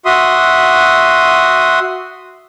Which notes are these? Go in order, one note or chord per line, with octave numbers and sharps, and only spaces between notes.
F#4 E5 C6 D#6